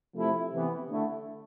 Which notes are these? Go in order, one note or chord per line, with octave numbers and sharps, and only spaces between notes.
C3 F3 A3 E4
C3 E3 B3
D3 A3 E4